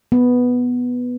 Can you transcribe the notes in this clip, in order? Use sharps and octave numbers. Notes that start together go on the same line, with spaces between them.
B3